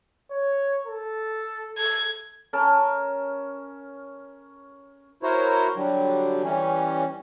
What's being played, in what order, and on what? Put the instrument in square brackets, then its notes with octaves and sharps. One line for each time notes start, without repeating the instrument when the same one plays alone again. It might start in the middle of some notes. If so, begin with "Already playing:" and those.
[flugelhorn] C#5
A4
[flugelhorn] A4 [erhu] G#6
[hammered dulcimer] C#4 A#4 A5 A#5
[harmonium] E4 F#4 A#4 C5 C#5
D3 F#3 G3
E3 G3 C#4